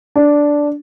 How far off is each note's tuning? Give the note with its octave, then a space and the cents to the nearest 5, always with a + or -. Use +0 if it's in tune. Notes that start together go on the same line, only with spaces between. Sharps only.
D4 -5